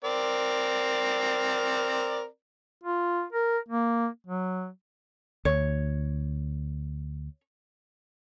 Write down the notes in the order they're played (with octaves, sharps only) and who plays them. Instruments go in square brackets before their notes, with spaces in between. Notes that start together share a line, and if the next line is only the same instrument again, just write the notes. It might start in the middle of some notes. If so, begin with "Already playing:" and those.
[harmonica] C4 A#4 D5
[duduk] F4
A#4
A#3
F#3
[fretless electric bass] D2 [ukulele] C#5